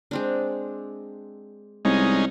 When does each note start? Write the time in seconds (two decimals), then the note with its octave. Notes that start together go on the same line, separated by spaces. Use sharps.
0.11 G#3 C4 D4
1.85 C2 G#3 C#4 D#4